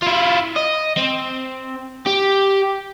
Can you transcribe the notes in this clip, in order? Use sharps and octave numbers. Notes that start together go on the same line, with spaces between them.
E4 F4
D#5
C4
G4